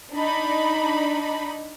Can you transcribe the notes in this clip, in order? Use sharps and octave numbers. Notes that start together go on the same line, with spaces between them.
D4 D#4 B5